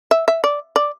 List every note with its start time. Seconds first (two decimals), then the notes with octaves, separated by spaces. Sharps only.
0.11 E5
0.28 E5
0.44 D5
0.76 D5